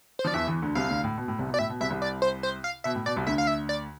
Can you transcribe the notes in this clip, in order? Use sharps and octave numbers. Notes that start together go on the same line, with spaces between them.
C5
F3 D5
E2 E3 E5
E2 E3
D2 D3
C2 C3 F5
D2 D3
A2
B2
A2
C2 C3
B2
D5
A2 E5
B2
C2 C3 E5
C2 C3
D5
C5
C5
F5
B2 E5
A2
B2 D5
C2 C3
D2 D3 E5
F5
E5
D5